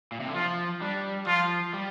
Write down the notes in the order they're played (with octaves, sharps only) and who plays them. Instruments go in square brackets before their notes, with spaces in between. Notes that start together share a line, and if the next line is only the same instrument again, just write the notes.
[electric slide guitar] A#2
C3
D3
[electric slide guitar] F3 [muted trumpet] F4
[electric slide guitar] G3 [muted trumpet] D4
[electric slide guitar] F3 [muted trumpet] F4
[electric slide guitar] G3